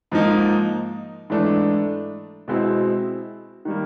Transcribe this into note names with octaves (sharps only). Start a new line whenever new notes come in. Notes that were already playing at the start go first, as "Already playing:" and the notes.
G#2 F3 A#3 D#4
G#2 E3 A3 D4
B2 G#3 C4 E4
D#3 G3 A#3